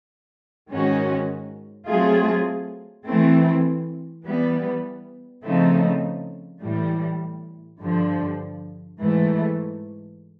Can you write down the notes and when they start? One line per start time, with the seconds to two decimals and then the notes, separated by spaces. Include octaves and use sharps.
0.69 G#2 D#3 G#3 C#4 F#4
1.87 F#3 A3 C4 F4 G#4
3.06 E3 A3 C4
4.24 E3 G3 B3
5.44 C#3 F3 A3 C4 D#4
6.61 A2 E3 G3
7.80 G2 D3 F3
9.00 G#2 E3 A3